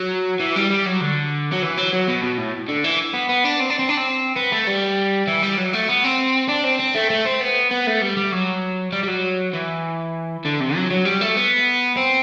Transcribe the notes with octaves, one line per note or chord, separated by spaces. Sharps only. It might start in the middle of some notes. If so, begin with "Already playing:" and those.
Already playing: F#3
E3
G3
G3
F#3
D3
F#3
E3
F#3
F#3
B2
B2
A2
D3
E3
B3
B3
D4
C4
D4
C4
D4
C4
B3
A3
G3
E3
G3
F#3
A3
B3
C4
D4
C4
C4
A3
A3
C4
B3
B3
A3
G3
G3
F#3
G3
G3
F#3
E3
D3
C3
F#3
F#3
G3
A3
B3
C4